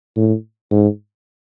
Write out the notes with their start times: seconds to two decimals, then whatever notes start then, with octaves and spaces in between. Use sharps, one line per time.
0.17 A2
0.71 G#2